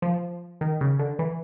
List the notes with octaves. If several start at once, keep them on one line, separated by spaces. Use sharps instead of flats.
F3
D#3
C#3
D3
E3